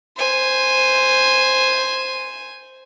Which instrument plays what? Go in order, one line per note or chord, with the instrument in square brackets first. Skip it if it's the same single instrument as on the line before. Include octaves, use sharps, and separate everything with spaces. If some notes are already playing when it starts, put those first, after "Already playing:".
[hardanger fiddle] C5 G#5